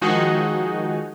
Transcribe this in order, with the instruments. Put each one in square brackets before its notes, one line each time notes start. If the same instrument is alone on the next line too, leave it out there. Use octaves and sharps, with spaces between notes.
[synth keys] D#3 F3 G#3 D#4 F#4 G#4